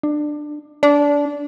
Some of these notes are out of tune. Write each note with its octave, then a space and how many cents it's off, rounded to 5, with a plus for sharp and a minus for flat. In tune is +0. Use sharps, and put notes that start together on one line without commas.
D4 +20
D4 -20